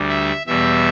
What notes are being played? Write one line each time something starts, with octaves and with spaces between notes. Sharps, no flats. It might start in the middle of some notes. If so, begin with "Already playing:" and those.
Already playing: D2 D3 G3
E5
E2 B2 G3 E5